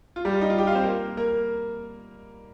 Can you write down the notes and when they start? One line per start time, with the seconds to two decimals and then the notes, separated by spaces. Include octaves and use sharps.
0.16 F4
0.25 G3 G4
0.33 F4
0.41 D#4
0.50 F4
0.58 G4 G5
0.67 F4 F5
0.75 C4 C5
0.84 A#3 A#4
1.17 A#3 A#4